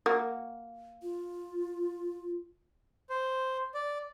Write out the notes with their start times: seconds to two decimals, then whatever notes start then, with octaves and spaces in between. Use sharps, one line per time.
0.06 A#3 F#4
1.02 F4
3.10 C5
3.74 D5